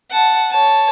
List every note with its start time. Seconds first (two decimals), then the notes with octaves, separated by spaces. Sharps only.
0.11 F#5 A5
0.51 C#5 A5